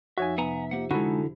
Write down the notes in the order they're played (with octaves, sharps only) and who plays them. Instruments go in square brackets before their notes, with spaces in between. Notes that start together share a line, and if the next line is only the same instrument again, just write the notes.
[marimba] F2 F3 D#4 [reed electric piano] F#4 C#5 G#5 [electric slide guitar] E5
[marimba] C3 [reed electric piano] B3 [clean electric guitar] F#5 G#5 A#5
[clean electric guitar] A#3 F#5 [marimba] F4 G4 C5
[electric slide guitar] D3 E4 [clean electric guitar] G#3 D#4 [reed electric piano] F#4 A4 [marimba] B5